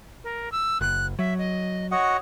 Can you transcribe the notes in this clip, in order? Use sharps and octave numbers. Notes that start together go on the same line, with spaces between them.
A#4
E6
F#1 F#6
F#3 E5
D#5
F#4 C#5 D#5 F#5